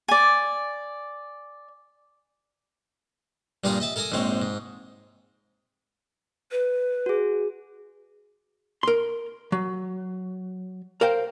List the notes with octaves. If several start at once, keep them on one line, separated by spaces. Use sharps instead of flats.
D5 G#5
G2 A#2 G3 F4 G#4 A#5
D#5 E5 A5
A4 A#4 G#5 A#5 D#6
A#1 G#2 G#3 C4 C#5
G#2
B4
F#4 G#4
A#4 C6
F#3
A#4 C5 F5 G5